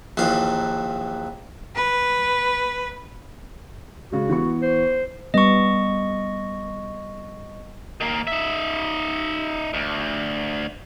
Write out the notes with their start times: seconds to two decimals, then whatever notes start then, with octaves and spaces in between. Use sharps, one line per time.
0.17 A#1 D#2 E3 F5
1.75 B4
4.12 C#3 G#3 F#4
4.30 E3 B3 C#6
4.63 C5
5.34 G3 B3 D#5 C#6
8.01 D#3 A#3
8.27 D#4 E5
9.74 D2